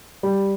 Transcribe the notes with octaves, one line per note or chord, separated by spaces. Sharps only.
G3